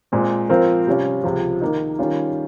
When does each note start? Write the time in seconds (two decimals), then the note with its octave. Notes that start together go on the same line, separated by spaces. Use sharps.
0.12 A#2 G#3 C4
0.49 F3 C4 F4 A#4
0.87 C3 G3 C#4 F4
1.24 C#2 C3 F3
1.61 D#3 A#3 D#4
1.99 D#3 G3 C#4 F4